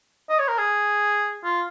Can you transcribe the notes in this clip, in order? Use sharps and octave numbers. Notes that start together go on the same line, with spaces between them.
D#5
C#5
A#4
G#4
F4